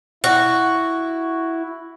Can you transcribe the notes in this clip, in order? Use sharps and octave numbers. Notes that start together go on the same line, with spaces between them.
E4 F#4